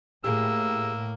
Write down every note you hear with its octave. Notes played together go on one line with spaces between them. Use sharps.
A2 A#3 G4 G#4 E6